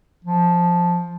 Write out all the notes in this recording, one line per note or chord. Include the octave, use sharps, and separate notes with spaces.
F3